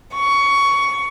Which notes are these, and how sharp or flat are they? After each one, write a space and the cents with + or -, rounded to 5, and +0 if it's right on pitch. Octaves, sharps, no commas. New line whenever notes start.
C#6 +15